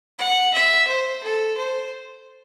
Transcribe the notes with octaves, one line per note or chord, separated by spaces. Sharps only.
F#5
E5
C5
A4
C5